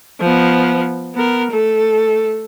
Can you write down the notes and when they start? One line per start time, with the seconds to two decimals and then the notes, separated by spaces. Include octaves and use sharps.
0.20 F3 B3
1.15 B3 A#4
1.52 A3 A4